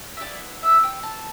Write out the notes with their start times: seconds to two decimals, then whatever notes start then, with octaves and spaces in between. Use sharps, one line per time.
0.17 E5
0.21 B3 E4 G4 D5
0.63 E5
0.84 G5
1.03 A5